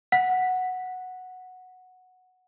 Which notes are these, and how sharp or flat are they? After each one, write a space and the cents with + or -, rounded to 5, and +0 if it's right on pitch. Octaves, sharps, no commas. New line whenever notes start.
F#5 -5